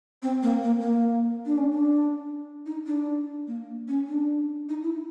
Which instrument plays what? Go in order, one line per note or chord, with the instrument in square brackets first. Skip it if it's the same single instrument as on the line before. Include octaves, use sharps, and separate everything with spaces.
[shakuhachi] C4
A#3
A#3
A#3
D4
C#4
D4
D#4
D4
A#3
C#4
D4
D#4
E4